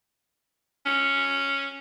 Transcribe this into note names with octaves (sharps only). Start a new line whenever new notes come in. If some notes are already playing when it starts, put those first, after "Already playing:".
C#4